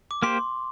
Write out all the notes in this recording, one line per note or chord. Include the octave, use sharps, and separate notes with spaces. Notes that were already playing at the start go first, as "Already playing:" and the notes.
D6
A#3 G4 C5 C6